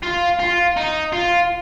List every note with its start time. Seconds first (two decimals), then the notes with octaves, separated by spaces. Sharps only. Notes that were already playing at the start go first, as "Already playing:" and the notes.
0.03 F4
0.40 F4
0.77 D#4
1.13 F4